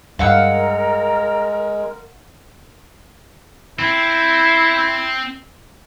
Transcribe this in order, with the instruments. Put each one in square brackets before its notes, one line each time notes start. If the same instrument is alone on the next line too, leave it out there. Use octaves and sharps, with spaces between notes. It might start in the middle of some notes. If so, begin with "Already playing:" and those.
[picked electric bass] G2 [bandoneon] G#3 [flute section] A#4 [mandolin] F5 F#5 E6
[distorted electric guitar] C4 [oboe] E4